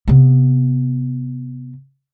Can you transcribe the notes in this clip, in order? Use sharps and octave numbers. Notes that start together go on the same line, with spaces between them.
C3 B3